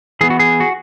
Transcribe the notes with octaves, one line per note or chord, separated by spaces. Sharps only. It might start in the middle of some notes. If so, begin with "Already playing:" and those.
E3 B3 G#4
F#4
G#4
F#4